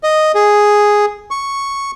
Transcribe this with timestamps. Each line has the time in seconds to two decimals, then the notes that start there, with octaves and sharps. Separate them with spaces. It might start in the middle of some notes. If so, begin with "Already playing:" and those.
0.03 D#5
0.35 G#4
1.31 C#6